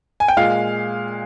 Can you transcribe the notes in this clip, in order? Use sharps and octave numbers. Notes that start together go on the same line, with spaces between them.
G#5
G5
A#2 G#3 F5